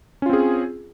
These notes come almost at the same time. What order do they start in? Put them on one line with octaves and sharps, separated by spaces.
C#4 F4 C4 G#4